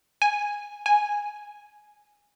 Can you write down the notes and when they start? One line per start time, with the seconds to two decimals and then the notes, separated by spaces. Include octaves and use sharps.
0.22 G#5
0.86 G#5